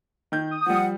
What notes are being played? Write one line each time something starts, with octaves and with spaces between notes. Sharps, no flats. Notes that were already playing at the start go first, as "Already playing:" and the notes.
D#3 G6
D#6
F3 G3 F#5